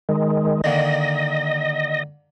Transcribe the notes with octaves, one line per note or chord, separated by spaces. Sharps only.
D#3 G#3
D3 D#3 A#3 D#5